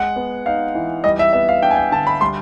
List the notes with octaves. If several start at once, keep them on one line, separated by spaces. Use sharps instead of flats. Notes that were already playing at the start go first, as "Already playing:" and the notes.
Already playing: G#3 F#5
B3
D#4 F5
E3
G3 D#5
E5
B3 E5
F5
D4 G5
G#5
G5
D3 A5
B5
G3 C6